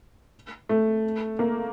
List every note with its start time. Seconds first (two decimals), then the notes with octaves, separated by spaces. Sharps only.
0.69 A3
1.39 A#3